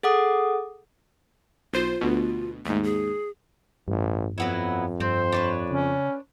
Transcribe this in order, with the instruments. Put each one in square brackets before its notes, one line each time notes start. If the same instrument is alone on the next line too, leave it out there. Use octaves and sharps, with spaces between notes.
[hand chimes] G#4 A4 F#5 D6 D#6
[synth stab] B1 C5 [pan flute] F4
[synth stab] D2 B2
[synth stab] D#2 G#2 [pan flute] A3
[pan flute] G#4
[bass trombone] A1 [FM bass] G2
[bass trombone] F2 [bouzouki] F#3 B3 E4
[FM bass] G2 [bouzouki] C4 [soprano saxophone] C5
[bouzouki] D4 B4 C#5
[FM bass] C#3 [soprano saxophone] C#4